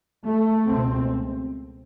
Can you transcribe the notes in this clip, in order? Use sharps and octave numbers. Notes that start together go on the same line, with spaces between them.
A3
C#2 B2 C4